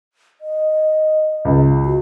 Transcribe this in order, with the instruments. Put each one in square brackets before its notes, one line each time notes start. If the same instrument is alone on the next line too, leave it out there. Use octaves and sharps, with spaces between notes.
[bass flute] D#5
[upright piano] C#2
[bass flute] F#4